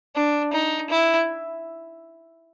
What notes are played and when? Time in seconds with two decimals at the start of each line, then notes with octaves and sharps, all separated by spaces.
0.16 D4
0.53 D#4
0.90 E4